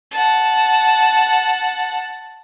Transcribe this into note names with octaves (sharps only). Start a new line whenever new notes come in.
F#5 A5